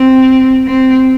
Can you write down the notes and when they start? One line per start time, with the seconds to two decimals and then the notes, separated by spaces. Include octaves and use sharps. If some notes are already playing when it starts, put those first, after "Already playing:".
Already playing: C4
0.68 C4